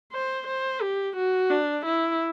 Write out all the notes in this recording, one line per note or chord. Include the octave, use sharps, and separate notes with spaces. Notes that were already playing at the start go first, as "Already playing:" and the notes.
C5
C5
G4
F#4
D4
E4